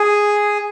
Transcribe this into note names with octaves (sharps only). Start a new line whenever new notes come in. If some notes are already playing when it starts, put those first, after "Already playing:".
Already playing: G#4